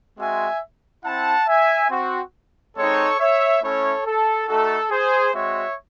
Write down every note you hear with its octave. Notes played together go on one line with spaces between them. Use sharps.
G#3 C4 F#4 E5 G#5
C4 E4 F#5 A5
E5 G#5
C4 F#4
G#3 C4 D#4 A4 C#5
C#5 E5
A3 C#4 E4 A4 C#5
A4
A3 D#4 F#4 A4
G#4 C5
G#3 C4 F#4 C#5 E5